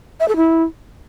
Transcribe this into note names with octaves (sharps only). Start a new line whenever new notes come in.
E5
A4
E4